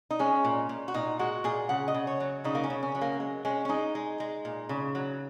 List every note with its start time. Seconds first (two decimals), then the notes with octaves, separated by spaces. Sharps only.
0.11 D#4
0.19 G#3 C#4
0.45 A#2
0.69 A#2
0.88 F#4
0.94 A#2 D#4
1.19 G#3 F#4
1.44 A#2 G#4
1.69 C#3 F#5
1.88 D#5
1.94 C#3
2.07 C#5
2.20 F#3
2.44 C#3 D#4
2.55 A#3
2.64 C#4
2.70 C#3
2.83 C#4
2.95 F#3
3.01 A#3
3.20 G#3
3.45 G#3 C#4
3.65 C#4
3.69 G#3 D#4
3.95 G#3
4.20 G#3
4.45 A#2
4.69 C#3
4.95 F#3